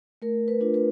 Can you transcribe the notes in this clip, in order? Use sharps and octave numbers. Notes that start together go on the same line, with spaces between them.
A3 A#4
B4
D4 F4
B4